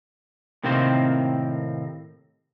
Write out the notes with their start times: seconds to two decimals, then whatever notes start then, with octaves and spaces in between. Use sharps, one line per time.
0.64 A2 C3 D#3 A#3 C4 C5